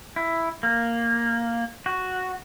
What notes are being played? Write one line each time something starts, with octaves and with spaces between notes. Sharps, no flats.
E4
A#3
F#4